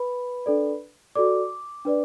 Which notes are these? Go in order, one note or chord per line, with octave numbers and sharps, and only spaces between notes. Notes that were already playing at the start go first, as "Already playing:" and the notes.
Already playing: B4 B5
D4 A4 D5
F#4 A4 D5 D6
D4 B4 D5